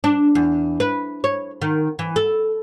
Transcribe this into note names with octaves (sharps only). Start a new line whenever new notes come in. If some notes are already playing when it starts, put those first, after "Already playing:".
D4
E2
B4
C#5
D#3
E3
A4